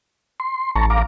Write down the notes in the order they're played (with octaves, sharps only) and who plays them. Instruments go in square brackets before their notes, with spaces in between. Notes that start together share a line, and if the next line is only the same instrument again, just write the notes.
[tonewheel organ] C6
[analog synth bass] A1 [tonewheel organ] A5 A#5 C#6
[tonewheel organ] F5 A#5 D6